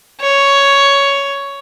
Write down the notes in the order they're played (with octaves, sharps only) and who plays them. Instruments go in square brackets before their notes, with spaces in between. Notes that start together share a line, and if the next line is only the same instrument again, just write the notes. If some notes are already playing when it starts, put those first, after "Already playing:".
[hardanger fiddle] C#5